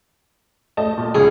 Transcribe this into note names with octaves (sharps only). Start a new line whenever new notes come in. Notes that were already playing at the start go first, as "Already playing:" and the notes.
A3 D#5 A5
A#2
C#2 G#4